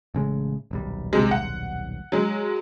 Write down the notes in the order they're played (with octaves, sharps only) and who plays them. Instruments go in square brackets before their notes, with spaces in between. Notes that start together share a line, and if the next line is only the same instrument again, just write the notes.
[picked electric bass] A1 C#3 G#3
D#1 B1 G3
[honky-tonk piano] C3 G#3
F#5
F#3 G#3